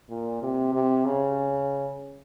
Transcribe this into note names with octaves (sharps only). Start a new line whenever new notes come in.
A#2
C3
C3
C#3